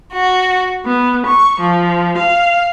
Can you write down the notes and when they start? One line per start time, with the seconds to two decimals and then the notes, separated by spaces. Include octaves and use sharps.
0.12 F#4
0.85 B3
1.26 C#6
1.61 F3
2.18 F5